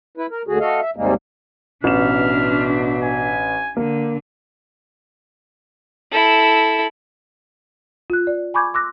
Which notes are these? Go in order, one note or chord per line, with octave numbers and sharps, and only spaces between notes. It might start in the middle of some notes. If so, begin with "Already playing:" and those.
E4 B4
A#4
D2 D3 F#4 G#4
A3 F#4 A4 D#5 F5
E5
D#2 G#2 C3 G3 G#3 A#3
A1 B2 D4 E5 F6 E7
G#5
D3 A#3
E4 A4
F4 F#6
D5
G#5 B5 C#6 D6 G6 G#6
C6 D6 E6 F#6 A#6